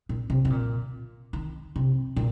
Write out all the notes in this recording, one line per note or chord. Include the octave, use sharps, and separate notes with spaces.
A#2
C3
C3
A#2
D#3
C3
A#2